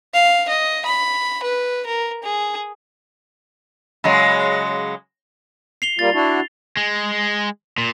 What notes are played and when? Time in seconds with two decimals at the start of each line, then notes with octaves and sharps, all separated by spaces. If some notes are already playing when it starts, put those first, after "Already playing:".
0.14 F5
0.49 D#5
0.85 B5
1.43 B4
1.86 A#4
2.23 G#4
4.04 C#3 F#3 G#3
5.82 C7 F7 G7
5.99 G3 A#3 F4 A6
6.14 D4 E4 F#4
6.77 G#3
7.78 A#2